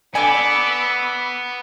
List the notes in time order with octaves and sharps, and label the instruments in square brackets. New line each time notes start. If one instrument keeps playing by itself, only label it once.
[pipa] D3 D5 G#5 [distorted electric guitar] B3 [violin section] B5 D6 E6